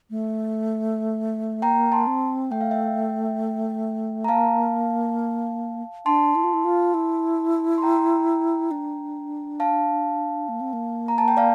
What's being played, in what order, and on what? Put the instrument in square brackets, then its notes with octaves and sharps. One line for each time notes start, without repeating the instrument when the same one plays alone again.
[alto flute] A3
[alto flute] A#3 [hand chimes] G5 A#5
[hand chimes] A5 C6
[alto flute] C4
[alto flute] A3 [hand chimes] G5
[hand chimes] F5
E5 G5
A#5
[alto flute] A#3 [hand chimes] F5 A5
[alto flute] D4 [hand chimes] A5 C6
[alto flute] E4
F4
E4
F4
E4
[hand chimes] C6
G5 A#5
[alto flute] D4
[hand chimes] F5 A5
[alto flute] A#3
C4
A#3
[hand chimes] A#5
A5
G5
D5 F5